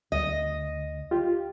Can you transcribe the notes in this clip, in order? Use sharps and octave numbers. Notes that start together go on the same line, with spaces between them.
D2 D#5
F4 G4